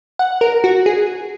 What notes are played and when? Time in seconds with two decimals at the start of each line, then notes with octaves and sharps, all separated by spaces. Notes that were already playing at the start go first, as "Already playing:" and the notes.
0.19 F#5
0.41 A#4
0.64 F#4
0.86 G#4